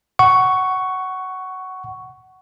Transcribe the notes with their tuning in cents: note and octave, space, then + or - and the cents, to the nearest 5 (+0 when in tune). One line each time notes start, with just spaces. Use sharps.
F#5 +15 C#6 +5